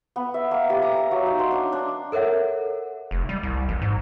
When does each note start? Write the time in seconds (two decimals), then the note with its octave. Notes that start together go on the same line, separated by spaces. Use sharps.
0.16 B3
0.34 E5
0.51 A#3
0.70 G4
0.82 A#5
0.97 A#5
1.11 F#3
1.26 D#4
1.39 C6
1.51 D4
1.72 D4
2.12 A4 A#4 C#5 E5 F#5
3.11 F1
3.29 G3
3.43 C2
3.69 A1
3.82 G#2